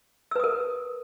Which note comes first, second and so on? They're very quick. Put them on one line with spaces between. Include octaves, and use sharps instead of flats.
E6 B4 D#6 A#4